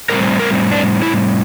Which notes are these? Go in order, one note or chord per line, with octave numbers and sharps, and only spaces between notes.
A2 G3 C4 A#4
A#4
D4
E4